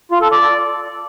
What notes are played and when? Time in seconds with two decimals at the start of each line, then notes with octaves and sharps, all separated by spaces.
0.11 F4
0.21 A4
0.31 D5